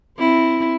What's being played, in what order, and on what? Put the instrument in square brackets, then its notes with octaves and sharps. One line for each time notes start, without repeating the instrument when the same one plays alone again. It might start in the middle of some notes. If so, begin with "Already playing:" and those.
[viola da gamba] C4 E4